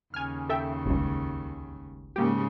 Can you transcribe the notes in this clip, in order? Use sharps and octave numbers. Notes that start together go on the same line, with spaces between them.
D#2 C#3 G#5 F6
A4 E5 G5
G1 C#2
G#2 C#3 A#3 G4